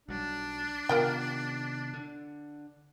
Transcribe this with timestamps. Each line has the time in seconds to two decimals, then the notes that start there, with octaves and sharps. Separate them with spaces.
0.09 B1 F#3 G3 D4
0.89 C3 D#3 B3 F4 A#4 G5
1.94 D3